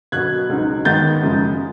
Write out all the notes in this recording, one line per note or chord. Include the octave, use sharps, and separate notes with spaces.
B2 F#3 B3 F#6 G#6
C#2 B2 F#3 B3 D#4
G#2 D#3 G#3 B3 G6 A6
F#2 C#3 F3 G#3